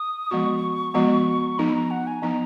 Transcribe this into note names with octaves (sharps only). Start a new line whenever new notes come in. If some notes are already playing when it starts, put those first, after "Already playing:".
Already playing: D#6
F3 G#3 B3 F#4 C#6
F3 G#3 B3 F#4
F3 B3 D#4 A#5
B5
A#5
F#5
G#5
F3 B3 D#4 A#5